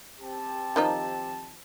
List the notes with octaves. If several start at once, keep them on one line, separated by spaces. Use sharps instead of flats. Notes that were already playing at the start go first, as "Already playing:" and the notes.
C4 G4 A5
D#3 F3 D#4